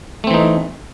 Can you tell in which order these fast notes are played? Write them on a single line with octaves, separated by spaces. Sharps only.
A3 C4 E3 D#4